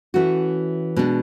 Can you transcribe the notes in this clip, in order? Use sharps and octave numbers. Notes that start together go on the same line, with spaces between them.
E3 A3 C#4 F#4
B2 G#3 D4